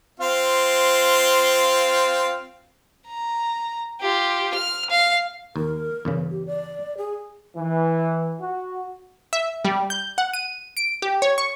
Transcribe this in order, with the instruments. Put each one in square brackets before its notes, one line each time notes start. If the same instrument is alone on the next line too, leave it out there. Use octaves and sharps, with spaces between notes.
[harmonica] C4 F4 F5
[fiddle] A#5
F4 G4
F6
F5
[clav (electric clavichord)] D#2 [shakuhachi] A#4
[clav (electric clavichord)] E2 G2 C#3
[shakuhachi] G4
D5
G#4
[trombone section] E3
F#4
[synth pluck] E5
G3
G6
F#5
D#7
D7
G4
C#5
C#6